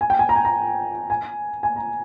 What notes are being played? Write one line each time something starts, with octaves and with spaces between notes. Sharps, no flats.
G#5
G5
G#5
A#5
G#5
A#5
G#5
G#5
A#5